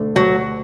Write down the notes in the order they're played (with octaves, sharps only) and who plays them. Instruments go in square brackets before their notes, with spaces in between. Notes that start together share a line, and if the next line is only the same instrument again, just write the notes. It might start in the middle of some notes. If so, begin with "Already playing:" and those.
Already playing: [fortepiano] D2 D3 A3
[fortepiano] D2 [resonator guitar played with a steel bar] F#3